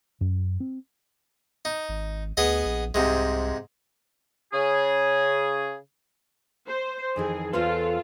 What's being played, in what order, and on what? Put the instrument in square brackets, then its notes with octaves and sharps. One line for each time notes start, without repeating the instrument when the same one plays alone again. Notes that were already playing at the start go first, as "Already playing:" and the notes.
[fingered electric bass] F#2
C4
[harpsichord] D#4
[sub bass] G#1
[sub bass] D2 [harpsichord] B3 G#4 D#5
[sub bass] A#1
[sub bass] C2 [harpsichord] G#2 C3 G#3
[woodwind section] C#3 G#4
[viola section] C5
[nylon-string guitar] F2 D#3 E3 [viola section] G#4
[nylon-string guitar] E2 B4 C5 [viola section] F4 A4